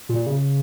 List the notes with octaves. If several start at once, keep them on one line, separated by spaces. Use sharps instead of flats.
A#2
C#3